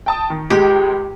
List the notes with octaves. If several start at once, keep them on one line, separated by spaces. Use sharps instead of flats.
G5 A5 D#6
D#3
C#2 G#3 G4 D#5